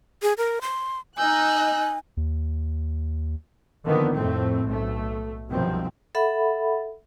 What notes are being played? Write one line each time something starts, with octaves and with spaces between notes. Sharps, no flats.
G#4
A#4
C6
D#4 D#5 G#5 E6 F#6 G6
D#2
D3 D#3 F3 A#3 B3
F2 A2 A3 C4
B1 A3
C2 F#2 B2 D#3 F3 C4
A4 E5 F#5 B5